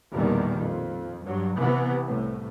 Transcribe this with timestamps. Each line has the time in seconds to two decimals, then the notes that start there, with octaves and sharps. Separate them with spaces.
0.13 A#1 E2 B2 D#3 G3
0.59 F2
1.25 G2 F#3
1.57 C3 E3 B3
2.06 C2 A2